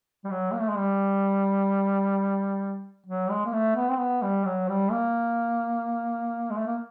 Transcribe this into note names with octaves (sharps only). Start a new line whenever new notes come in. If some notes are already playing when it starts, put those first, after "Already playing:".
G3
F#3
A#3
A3
G#3
G3
F#3
G#3
A#3
A3
B3
C4
B3
G3
F#3
G3
A#3
G#3
A3
A#3